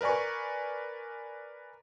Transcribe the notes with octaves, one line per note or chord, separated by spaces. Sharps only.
A#4 B4 D5 G#5 C#6